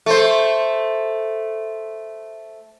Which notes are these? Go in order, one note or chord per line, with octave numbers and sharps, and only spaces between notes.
A3 C5